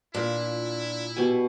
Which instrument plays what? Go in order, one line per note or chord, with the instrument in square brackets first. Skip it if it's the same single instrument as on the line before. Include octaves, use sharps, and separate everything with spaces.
[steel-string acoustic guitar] A#2 [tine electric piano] D4 F4 [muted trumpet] E4
[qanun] B2 G3 G#5